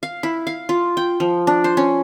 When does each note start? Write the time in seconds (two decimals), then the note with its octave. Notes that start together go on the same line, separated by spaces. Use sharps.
0.03 F5
0.23 E4
0.47 F5
0.69 F4
0.97 G5
1.20 F3
1.47 D4
1.64 C5
1.77 C#4